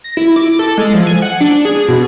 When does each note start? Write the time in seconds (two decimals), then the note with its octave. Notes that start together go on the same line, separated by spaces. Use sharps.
0.04 A#6
0.17 E4
0.36 D6
0.59 A4
0.77 G#3
0.94 F3
1.07 G#5
1.22 F#5
1.41 D4
1.65 G#4
1.88 B2